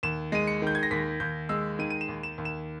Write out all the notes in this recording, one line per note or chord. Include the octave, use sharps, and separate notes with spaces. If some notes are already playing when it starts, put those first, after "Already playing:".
D#2 E7
G#3 D#7
C#7
D#3 G6
G#6
A#6
D#2 B6
D#2 G6
G#3 E6
D#3 D#7
D#7
E7
D#2
E7
D#2
E7